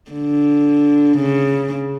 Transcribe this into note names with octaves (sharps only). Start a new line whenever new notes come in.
D3
C#3